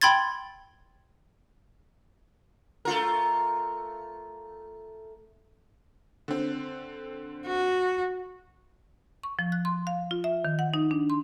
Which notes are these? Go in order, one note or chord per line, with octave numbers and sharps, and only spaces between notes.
G5 B5 C6 G#6 A6
A3 F4 A#4
D3 C4
F#4
C#6
F3
F#6
C6
F5
F4
E5
D#3
F#5
D#4
D4
C6